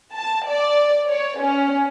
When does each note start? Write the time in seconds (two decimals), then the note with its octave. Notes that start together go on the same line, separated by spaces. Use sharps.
0.15 A5
0.49 D5
1.09 C#5
1.39 C#4